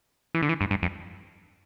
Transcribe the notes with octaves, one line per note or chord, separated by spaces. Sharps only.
E3
D3
E3
G2
G2
F2